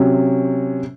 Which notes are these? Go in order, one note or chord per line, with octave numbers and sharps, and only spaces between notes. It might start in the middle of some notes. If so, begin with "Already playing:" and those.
Already playing: C3 F#3 C#4